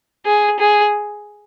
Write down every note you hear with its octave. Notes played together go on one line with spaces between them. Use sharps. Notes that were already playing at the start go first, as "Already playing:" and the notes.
G#4
G#4